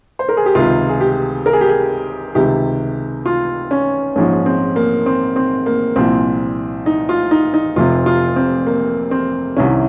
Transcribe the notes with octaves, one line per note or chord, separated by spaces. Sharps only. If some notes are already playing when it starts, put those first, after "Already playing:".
C5
A#4
G#4
G4
C#2 C3 D#3 F4
G#4
G4
A#4
G#4
G4
G#4
C#2 C3 D#3 G4
F4
C#4
A#1 G#2 F3 C#4
C4
A#3
C4
C4
A#3
C2 A#2 F3 C4
D#4
F4
D#4
D#4
F1 F2 C3 F4
F4
C4
A#3
C4
C2 C3 D#3 C#4